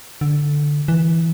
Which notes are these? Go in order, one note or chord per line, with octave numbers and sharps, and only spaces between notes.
D3
E3